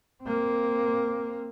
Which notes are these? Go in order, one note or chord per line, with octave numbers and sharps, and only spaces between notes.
A#3 C4